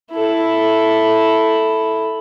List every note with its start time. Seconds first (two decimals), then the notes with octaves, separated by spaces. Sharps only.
0.12 E4 A4